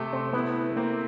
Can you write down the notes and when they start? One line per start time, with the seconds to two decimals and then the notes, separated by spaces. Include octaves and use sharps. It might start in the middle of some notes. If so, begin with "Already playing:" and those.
Already playing: C3 A3
0.13 C4
0.33 B3 E4
0.76 A#3 C4